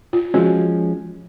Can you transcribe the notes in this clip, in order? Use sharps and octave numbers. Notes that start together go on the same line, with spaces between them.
F4
F3 G#3 C#4 F#4